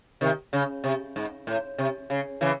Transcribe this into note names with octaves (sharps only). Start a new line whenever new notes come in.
C3 D#3
C#3
C3
G#2
A2
C3
C#3
C#3 E3